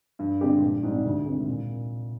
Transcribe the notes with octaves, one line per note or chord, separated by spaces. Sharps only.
G2
D3 G#3 C4 G4
A#1
G#2 G3 C4
D2
C3 D#3 G#3
A#2